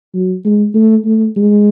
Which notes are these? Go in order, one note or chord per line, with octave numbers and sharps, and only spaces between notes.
F#3
G#3
A3
A3
G#3